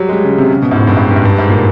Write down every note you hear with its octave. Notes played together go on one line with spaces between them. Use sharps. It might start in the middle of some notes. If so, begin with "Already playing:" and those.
Already playing: F#3 G3
G#3
G3
C#3
C3
C#3
B2
G#2
A2
G2
G#2
G2
G#2
G2
G#2
A#2